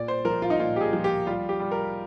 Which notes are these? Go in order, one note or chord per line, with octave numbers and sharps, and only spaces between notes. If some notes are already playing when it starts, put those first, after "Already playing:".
Already playing: A#2 D5
C5
F3 A#4
F4
D#4
A#2 F4
G4
G#4
F3
G4
G3 F4
G4
G3
A#4